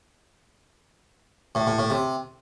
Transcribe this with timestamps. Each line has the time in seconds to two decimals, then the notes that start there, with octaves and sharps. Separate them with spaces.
1.55 A2
1.67 A2
1.78 A2
1.90 C3